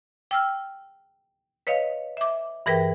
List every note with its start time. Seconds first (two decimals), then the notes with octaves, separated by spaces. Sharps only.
0.31 G5 E6 F6
1.67 B4 C#5 D#5 F5
2.17 E5 D6
2.66 G2 E3 G#4 A#4 B4 G5